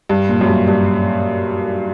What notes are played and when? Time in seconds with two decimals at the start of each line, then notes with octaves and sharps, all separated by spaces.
0.09 G2
0.29 A#2
0.41 F#2
0.48 G2
0.68 G2